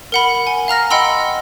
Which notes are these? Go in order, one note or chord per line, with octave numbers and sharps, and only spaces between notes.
A#4 F#5 B5
G#5
F5 A#5 F6 A#6
D#5 F#5 G5 B5 C6 E6